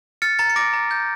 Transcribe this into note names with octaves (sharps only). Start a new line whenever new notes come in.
F6 A6 C#7
A#5 A6 C#7
C#7
D6 A#6 D7
A#5
G6